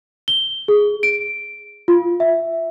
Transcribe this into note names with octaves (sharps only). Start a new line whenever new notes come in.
G7
G#4
D7
F4
E5